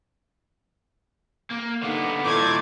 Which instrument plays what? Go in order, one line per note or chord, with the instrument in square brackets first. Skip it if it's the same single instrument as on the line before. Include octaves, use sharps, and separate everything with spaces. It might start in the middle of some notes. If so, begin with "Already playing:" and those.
[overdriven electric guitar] A#3
[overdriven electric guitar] D3 B3 [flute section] D#4 D6
[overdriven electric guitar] A#2 D#3 [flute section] E4 A4 G6 [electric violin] D6 G#6